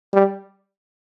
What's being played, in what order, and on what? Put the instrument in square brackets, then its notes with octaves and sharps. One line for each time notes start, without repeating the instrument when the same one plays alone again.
[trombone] G3